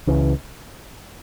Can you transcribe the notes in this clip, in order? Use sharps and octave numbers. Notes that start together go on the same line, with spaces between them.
C#2 C#3 E3